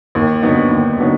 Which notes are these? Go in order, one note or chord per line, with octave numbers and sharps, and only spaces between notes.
D#2
D3 F#3 B3 D#4
D#2
D3 F#3 B3 D#4